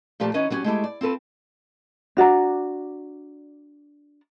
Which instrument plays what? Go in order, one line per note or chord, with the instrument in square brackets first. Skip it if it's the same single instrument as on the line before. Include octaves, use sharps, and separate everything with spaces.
[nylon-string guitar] A#2 F3 A3 G4 D5
E3 C#4 D#4 B4 D#5
F#3 B3 C#4 F#4 G4
G#3 A3 E4 G4
D5
C4 F4 A4 B4
[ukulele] D4 F#4 D5 A#5